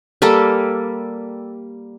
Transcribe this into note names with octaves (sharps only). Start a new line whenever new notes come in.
G3 A#3 A4